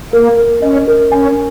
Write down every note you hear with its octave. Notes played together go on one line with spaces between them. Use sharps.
A#3 A#4
A#4
C#4 D#5
A#4
C#4 G#5